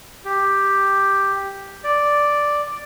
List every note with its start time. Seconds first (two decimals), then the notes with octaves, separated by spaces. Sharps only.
0.25 G4
1.84 D5